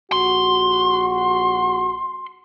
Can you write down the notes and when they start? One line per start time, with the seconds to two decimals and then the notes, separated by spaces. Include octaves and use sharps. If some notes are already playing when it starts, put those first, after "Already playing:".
0.12 A#1 F#4 C6